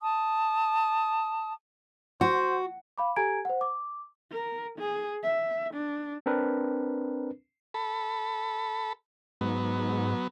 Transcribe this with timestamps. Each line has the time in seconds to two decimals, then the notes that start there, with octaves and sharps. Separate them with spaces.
0.01 A5 D#6
2.21 F#4 C5
2.98 F5 B5 D6
3.16 G4 A4 G#5 A#5 G#6 D7
3.45 C5 F#5
3.61 D6
4.31 A#4
4.78 G#4
5.23 E5
5.74 D4
6.26 C4 D4 A#4 B4
7.74 A4 B5
9.41 G#2 F#3 B3